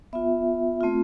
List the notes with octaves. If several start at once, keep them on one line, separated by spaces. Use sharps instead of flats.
B3 F4 E5
A3 C4 F4